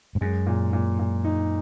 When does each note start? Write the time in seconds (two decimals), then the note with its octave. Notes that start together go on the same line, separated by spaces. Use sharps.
0.15 G#2
0.21 F#2 G#3
0.47 A#2
0.73 A#2
0.99 A#2
1.25 D#4